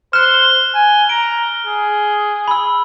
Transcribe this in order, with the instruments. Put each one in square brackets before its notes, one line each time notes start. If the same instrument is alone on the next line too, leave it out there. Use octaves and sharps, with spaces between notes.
[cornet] C5 [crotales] F6 [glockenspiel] F#6 E7
[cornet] G#5
[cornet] A#5 [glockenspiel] D7
[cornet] G#4
[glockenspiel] B5 E6